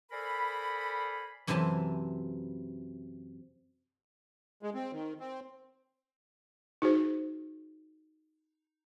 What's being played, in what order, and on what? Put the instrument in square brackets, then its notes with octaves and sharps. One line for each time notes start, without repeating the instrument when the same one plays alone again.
[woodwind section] A4 A#4 C5 D5 G#5 B5
[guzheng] F#2 C3 E3 E5 G#5 A5
[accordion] G#3
C4
D#3
C4
[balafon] D#4 F#4 G#4 C5